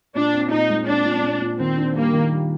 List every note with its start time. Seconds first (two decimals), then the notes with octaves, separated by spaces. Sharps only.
0.15 A#2 D4
0.33 C4
0.52 A#2 D#4
0.69 G#3
0.88 C4 D4
1.05 A#2
1.23 A#2
1.41 A#2
1.60 D#3 C4
1.78 D4
1.95 G3 A#3
2.13 D#3
2.31 G3